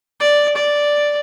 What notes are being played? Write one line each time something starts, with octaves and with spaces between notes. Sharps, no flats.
D5
D5